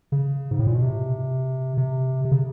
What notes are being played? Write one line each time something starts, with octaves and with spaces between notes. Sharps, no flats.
C#3
G#2
A2
A#2
B2
C3
C3
C3
C#3